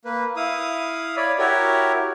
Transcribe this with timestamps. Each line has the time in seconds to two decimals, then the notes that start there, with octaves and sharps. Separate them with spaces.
0.05 A#3 B4
0.36 E4 F5 D#6
1.16 C#5 D5 B5
1.39 E4 F#4 G4 A#4 C#5